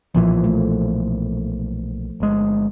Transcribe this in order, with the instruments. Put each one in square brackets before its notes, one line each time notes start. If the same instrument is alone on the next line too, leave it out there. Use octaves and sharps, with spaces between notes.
[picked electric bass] B1 A#2 E3 [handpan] F3
[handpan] A3
[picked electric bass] G1 G#3